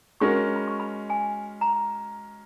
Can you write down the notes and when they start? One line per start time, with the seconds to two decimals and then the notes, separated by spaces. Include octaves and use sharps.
0.20 G#3 C#4 F#4 A#4 C#6
0.56 B5
0.68 C#6
0.80 B5
1.10 G#5
1.61 A#5